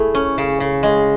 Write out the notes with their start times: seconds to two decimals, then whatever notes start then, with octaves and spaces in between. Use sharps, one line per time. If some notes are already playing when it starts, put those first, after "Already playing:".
Already playing: A3 E4 G#4
0.15 C#4
0.38 C#3
0.60 C#3
0.83 G#3